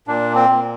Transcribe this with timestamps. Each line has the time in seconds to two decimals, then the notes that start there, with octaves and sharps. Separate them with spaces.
0.08 A#2 D4
0.35 C4
0.49 A#2